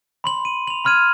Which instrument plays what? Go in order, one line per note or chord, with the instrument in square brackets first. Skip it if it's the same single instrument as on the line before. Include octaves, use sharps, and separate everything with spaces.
[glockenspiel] B5 C6 F#7
D#7
F7 F#7
B5 C6 F6 G#6 D#7